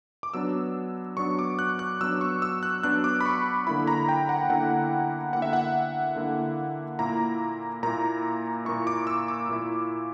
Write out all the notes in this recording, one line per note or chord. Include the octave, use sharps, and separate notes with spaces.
D6
F#3 B3 D4 E6
F#3 B3 D4 C#6
D6
F#6
F#6
F#3 B3 D4 E6
C#6
E6
F#6
F#3 B3 D4 F#6
D6
B5
C#6
D3 A#3 E4 B5
A#5
G5
F#5
D3 A#3 E4 F#5
D3 A#3 E4 F#5
E5
F#5
D3 A#3 E4
A#2 A#3 E4 A#5
A#2 A#3 E4 A#5
A#2 A#3 E4 C#6
D6
E6
D6
A#2 A#3 E4